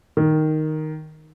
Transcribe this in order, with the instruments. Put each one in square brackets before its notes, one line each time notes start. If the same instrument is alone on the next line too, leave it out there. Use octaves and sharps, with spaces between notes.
[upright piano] D#3